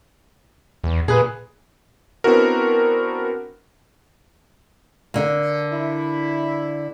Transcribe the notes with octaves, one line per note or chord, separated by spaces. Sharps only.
E2
A#2 G#4 B4
B3 C4 D4 E4 F#4 A#4
D3 A#3
E4